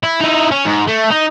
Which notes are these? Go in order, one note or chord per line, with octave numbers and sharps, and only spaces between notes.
E4
D#4 E4
C#4
G#2
A3
D#4